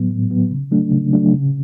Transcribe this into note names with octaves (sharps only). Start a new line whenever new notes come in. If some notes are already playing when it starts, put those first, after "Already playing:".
Already playing: A2 F#3 B3
A2
F#3 B3
C#3
F#3 A3 D4
C#3
F#3 A3 D4
C#3